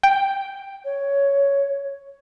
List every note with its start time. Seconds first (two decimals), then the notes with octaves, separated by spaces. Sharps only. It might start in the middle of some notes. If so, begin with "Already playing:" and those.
0.03 G5
0.85 C#5